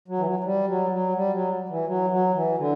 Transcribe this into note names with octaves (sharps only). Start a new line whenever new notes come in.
F#3
E3
F#3
F#3
G3
F#3
F#3
G3
F#3
E3
F#3
F#3
E3
D3